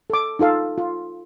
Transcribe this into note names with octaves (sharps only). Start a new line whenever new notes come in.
A4 D6
D#4 F4 A4 F5
F4